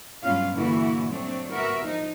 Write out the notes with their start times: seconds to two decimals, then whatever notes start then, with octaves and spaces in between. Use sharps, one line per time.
0.23 G2 F#3 B3 C#4 F4 F5
0.54 A#2 D3 E3 A#3 E4 F#4
1.08 F#3 A3 C4 D4
1.51 B3 F#4 A#4 E5
1.83 F3 D#4